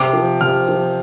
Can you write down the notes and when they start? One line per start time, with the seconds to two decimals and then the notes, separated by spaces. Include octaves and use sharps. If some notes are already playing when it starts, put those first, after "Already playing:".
Already playing: C3 D6
0.13 F3
0.41 C3 F6
0.68 F3